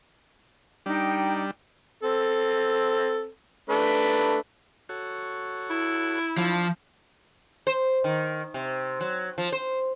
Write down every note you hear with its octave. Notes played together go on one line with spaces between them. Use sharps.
G3 D4 D#4 G5
C4 A4
A3 D4 B4
F#4 A4 C#5
E4
F3 D4 A5
C5
D#3
C3
F#3
F3
C5